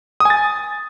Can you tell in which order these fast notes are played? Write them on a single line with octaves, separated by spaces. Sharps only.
D#6 G#5 A6